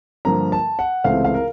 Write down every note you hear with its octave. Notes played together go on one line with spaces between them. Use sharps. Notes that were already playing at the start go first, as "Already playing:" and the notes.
G2 D3 F3 A#3 A#5
A5
F#5
C#2 C3 E3 A3 C4 F5
F5
A#4